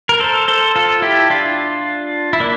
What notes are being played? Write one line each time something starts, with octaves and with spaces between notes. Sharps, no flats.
A#4
A4 C5
A4 C5
F4 A4
E4 G4
D4 F4
E4
A#3 D4